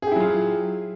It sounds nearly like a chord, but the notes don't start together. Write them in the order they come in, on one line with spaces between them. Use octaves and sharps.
G#4 G4 E4 F#3 F4